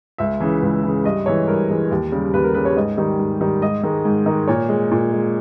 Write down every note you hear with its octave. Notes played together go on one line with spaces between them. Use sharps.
C#2 E5
C#3 E3
C#2
C#3 E3
G2 D#5
E3 G#3 C#5
G2 A#4
E3 G#3
D#2
C#3 G3
D#2 B4
A#4
C#3 G3 B4
C#5
G#2 D#5
D#3 G3
G#2
D#3 G3
G#2 D#5
D#3 G#3
G#2
D#3 G#3
A#2 C#5
G#3
A#2
G#3